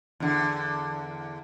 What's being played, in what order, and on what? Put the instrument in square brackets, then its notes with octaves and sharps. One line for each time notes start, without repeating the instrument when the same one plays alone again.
[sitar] E2 D3